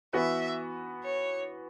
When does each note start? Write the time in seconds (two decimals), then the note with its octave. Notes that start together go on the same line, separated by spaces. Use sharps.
0.13 E3 B3 F#4 B4 E5
1.04 C#5